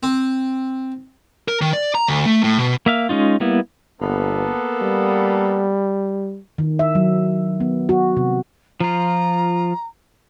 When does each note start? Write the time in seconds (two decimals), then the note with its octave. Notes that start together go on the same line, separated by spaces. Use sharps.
0.03 C4
1.48 A#4
1.62 D#3
1.73 D5
1.95 A#5
2.08 D2
2.26 A3
2.44 A2
2.59 B2
2.86 A#3 E5 F5
3.09 G#3 C#4 D#4 F4
3.40 G3 A#3 B3 E4
4.01 G1 A#3 B3 A4
4.82 G3
6.58 D#3
6.79 E5
6.95 F#3
7.60 B3
7.89 F#4
8.17 C3
8.80 F3 F4 A#5